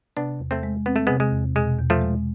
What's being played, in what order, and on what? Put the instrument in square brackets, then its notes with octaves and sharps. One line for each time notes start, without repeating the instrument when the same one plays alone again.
[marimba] C3 [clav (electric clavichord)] B3 D4
[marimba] E2
[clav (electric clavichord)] A3 C4
[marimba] G#3
[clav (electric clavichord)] B3 [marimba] C4
[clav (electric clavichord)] A3
[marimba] C3 [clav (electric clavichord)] G#3 B3
[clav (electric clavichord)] G#3
[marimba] E2
[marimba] B2 [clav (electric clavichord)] G#3
[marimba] E2
[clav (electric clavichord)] F3 A3
[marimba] G#3